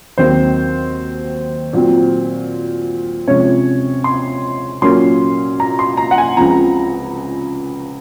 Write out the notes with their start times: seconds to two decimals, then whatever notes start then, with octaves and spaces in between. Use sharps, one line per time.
0.18 D#2 D#3 F#3 C4 C5
1.73 A#2 F#3 C4
3.28 C3 F3 G#3 C#4 C#5
4.04 C6
4.82 A#2 F#3 A#3 C#4 C6
5.60 A#5
5.79 C6
5.97 A#5
6.11 F#5
6.18 G#5
6.37 C#2 C#3 F3 C4 A#5